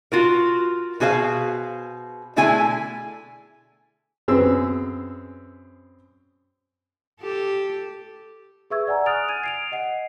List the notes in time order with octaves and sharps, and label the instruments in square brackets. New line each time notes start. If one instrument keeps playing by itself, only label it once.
[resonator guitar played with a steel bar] F4 F#4 A#4
B2 F#4 G#4 C5 E5 F5
B2 D3 A3 E4 G#4 G#5
[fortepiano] F#2 B3 C4 G#4 E6
[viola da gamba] G4 A4
[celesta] G#4 B4 E5 C#6 E6 G#6
D5 F#5 G#5 A#5
D#6 F6 F#6 A6 D7 F7
G#5 G#6 D#7
C7 D7 F7
D#5 F#5 C7